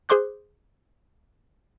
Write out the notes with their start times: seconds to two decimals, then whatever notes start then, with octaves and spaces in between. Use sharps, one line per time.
0.09 G#4 C5 C6 D6 F#6